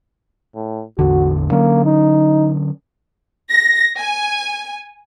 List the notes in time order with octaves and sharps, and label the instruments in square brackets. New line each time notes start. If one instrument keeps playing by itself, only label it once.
[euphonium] A2
[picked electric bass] A1 E2 D3 [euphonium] F#4
[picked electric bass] D3 F#3 C#4 [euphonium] A#3
[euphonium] D#4
[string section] A#6
G#5